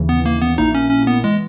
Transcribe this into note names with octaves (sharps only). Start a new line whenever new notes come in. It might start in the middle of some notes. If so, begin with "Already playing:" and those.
Already playing: D#2 C#3 E3
B3
A#3
B3
A#1 A#2 A#3 D#4 E4
C#4
C#4
B3
E3 G#3